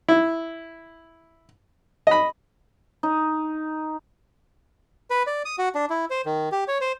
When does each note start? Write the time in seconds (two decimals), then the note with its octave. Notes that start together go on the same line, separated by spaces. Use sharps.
0.09 E4
2.07 D#5 B5
3.03 D#4
5.10 B4
5.27 D5
5.45 D#6
5.58 F#4
5.75 D4
5.90 E4
6.10 C5
6.26 D#3
6.52 G4
6.68 C#5
6.81 C5